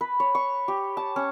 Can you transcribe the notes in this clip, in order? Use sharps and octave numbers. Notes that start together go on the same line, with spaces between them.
B4
C#5
C#6
G4
A5
C#4